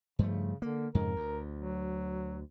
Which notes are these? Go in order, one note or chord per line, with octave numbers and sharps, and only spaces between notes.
G2 C#3 F3 A3
D3 A#3
F2 G#2 C#3 A#4
D2
F#3